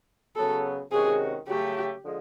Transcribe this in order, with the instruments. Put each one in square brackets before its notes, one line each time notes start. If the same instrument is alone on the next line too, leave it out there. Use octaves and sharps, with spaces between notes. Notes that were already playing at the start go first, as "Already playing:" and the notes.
[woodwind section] C#3 F#3 B3 [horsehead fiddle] A4
[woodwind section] C3 D#3 G#3 C#4 F#4 [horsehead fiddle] G#4
[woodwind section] C#3 F#3 A3 [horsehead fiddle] G4
[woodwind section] D3 F3 G#3